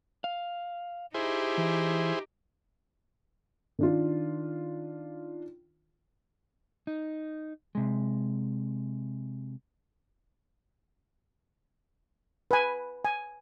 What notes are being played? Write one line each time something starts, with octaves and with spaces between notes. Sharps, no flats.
F5
D#4 E4 G4 G#4 C5
E3
D#3 D4 F4
D#4
C3 G#3
B4 G#5
G#5